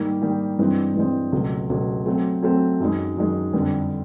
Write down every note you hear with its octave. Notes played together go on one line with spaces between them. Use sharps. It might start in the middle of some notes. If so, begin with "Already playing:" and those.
Already playing: G#2 D#3 G3 A#3
G#2 D#3 G3 A#3
G2 E3 G#3 C4
G2 E3 G#3 C4
C#2 B2 F#3 A3
C#2 B2 F#3 A3
F#3 A3 C4
F#3 A3 C4
F#2 D#3 G#3
F#2 D#3 G#3
F2 D3 G3 B3 D4